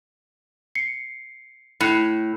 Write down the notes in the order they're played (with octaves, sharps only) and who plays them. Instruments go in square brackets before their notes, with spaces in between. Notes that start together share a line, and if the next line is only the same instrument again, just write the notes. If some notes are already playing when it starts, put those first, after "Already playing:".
[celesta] C7 C#7
[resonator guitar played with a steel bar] A2 [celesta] B5 F#6 C#7